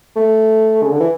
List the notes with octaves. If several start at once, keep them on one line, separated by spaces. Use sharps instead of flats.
A3
C#3
D3
E3